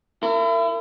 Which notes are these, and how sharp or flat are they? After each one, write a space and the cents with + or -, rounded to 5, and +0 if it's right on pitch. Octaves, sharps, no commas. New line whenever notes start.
E4 +35 A#4 -30